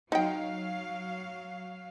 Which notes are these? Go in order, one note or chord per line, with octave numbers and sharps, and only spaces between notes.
F#3 D#4 F5 G5